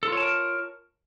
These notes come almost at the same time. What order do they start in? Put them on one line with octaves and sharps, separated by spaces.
A4 F4 C#5 A5 A#4